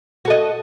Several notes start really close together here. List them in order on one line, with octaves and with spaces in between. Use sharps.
F#4 A4 D#5